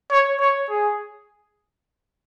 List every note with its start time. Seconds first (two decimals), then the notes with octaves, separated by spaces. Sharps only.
0.11 C#5
0.40 C#5
0.70 G#4